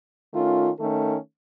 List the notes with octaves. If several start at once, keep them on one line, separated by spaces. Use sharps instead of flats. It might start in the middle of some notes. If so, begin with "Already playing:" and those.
D#3 A3 C#4 F4
D#3 A3 C#4 A4